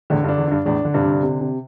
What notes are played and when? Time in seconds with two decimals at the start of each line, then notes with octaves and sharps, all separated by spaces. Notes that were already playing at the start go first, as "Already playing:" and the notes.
0.10 E2 A2 D3
0.24 G2
0.28 D4
0.38 E2
0.48 G2 D4
0.66 E2 A2 D4
0.85 D3
0.94 G2 C3
1.04 D3
1.23 C3
1.41 C3